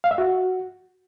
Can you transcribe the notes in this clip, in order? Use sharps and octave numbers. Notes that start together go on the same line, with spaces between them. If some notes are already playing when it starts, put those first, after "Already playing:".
F5
E5
F#4